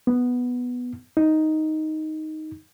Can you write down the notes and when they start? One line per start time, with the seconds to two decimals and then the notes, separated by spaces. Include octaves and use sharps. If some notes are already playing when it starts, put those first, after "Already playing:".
0.07 B3
1.17 D#4